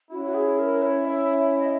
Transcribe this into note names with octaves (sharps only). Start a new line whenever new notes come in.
C#4 E4 F#4
F#4
G#4
A#4
C#5
E5
E5
D#5